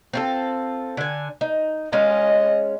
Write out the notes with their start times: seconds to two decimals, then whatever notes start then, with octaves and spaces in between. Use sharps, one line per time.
0.13 C4 F4 A4
0.97 D3 G#5
1.41 D#4
1.92 G#3 C#4 D#5 F5